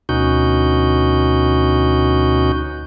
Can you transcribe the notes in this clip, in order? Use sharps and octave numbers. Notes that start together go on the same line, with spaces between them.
D2 B2 C#4 D#4 F#4 G6